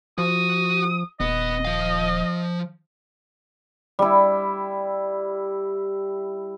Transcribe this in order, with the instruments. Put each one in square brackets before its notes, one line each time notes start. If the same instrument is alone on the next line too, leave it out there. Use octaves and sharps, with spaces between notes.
[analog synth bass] F3 [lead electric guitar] F#4 [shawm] D#6
[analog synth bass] D#1 [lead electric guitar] B3 [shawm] D#5
[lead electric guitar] F3 F5
[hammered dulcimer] G3 E4